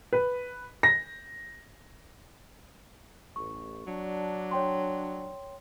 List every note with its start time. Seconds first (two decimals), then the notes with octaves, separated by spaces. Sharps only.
0.13 B4
0.83 A#6
3.36 A1 C#6
3.87 F#3 D4
4.51 C#5 G5 C6